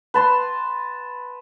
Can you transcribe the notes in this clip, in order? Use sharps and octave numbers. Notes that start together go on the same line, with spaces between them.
B4 A5 C6